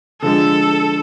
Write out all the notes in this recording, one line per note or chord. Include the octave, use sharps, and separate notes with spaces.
D3 F3 G#3 A4